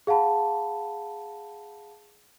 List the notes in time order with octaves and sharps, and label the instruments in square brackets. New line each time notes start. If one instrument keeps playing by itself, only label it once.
[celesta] G#4 F5 F#5 A5 B5